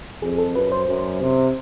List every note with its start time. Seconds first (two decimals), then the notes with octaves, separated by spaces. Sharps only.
0.22 F2 G#4
0.38 A4
0.55 F#2 B4
0.72 C5
0.88 F#2
1.21 C3